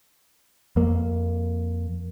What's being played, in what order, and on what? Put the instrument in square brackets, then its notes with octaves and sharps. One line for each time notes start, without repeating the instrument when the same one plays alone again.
[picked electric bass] F2 A#3